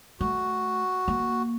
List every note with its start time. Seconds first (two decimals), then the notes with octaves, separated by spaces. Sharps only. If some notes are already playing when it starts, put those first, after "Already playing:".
0.20 A3 F#4
1.08 A#3